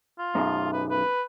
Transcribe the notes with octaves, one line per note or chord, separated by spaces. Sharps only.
F4
B1 F#2
B4
B4